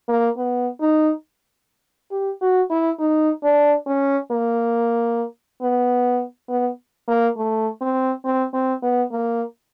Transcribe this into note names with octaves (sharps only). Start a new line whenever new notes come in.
A#3
B3
D#4
G4
F#4
E4
D#4
D4
C#4
A#3
B3
B3
A#3
A3
C4
C4
C4
B3
A#3